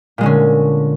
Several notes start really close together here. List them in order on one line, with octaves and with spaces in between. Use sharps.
A#2 G#3 D3 C#4